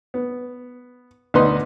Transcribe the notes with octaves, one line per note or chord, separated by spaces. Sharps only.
B3
D2 B3 D#4 B4 D#5 C6